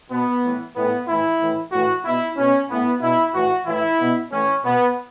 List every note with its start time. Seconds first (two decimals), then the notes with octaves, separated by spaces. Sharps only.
0.10 B2 B3
0.43 A2 E3
0.75 A2 E3 B3
1.08 A2 E3 E4
1.40 A2 E3
1.72 A2 E3 F#4
2.04 B2 E4
2.37 B2 C#4
2.69 A2 E3 B3
3.01 B2 E4
3.34 A2 E3 F#4
3.67 A2 E3 E4
3.99 B2
4.31 A2 E3 C#4
4.63 B2 B3